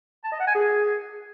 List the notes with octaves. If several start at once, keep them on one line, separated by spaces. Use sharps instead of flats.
A5
D#5
F#5
G#5
G#4